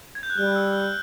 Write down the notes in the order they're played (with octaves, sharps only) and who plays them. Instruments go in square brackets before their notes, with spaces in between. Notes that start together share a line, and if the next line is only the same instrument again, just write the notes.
[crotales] G#6
G6
F#6
[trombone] G3 [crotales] F6
[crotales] E6
F6